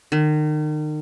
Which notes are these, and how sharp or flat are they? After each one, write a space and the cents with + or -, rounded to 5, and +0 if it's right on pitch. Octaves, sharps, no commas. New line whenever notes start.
D#3 -35